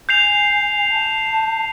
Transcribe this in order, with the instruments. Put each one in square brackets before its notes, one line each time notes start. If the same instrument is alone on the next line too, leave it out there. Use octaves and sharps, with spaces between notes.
[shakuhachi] G#5 [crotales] G6 C7 F7
[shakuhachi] A5